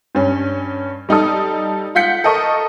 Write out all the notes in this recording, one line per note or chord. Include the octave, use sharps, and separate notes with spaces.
G2 C#4
G3 D#4 A4 D#6
F4 F#5 G6 B6 C#7
A4 A#4 D#5 C#6